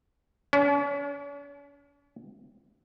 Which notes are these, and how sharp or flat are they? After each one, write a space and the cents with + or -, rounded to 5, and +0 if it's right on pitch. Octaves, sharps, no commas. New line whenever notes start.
C#4 +45